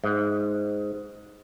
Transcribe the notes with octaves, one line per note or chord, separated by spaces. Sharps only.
G#2